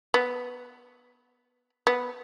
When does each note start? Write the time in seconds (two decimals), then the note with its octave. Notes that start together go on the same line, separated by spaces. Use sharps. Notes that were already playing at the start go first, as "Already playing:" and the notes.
0.14 B3
1.87 B3